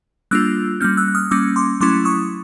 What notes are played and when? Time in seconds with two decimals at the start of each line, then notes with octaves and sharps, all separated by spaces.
0.31 G3 A#3 D4 F4 E6 F#6
0.80 G3 A#3 C#4 F6 G6
0.97 E6 F#6
1.08 F#6
1.15 D#6 F6
1.31 G3 A#3 C#4 D6 E6
1.56 C6 D6
1.81 F#3 A3 C#4 E4 C6 D6
2.05 C#6 D#6